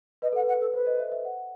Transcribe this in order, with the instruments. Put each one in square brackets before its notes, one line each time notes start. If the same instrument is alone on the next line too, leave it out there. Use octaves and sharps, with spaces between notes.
[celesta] B4 [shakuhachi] D#5
[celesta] A4 [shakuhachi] F#5
[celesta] B4 [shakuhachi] F#5
[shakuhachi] A4
[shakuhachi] B4 [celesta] C5
[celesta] D#5
E5
E5
F#5